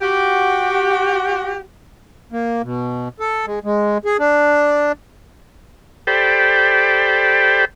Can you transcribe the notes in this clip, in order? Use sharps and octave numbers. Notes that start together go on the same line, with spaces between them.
F#4 G4
A#3
B2
A4
G#3
G#3
G#4
D4
G4 A4 C5 D5 G5 B5